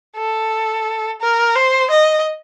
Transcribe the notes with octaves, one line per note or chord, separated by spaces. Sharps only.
A4
A#4
C5
D#5